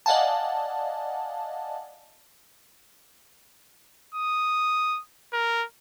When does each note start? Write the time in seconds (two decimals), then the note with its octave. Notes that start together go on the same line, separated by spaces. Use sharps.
0.06 D5 D#5 F5 F#5 G#5 A5
4.14 D#6
5.33 A#4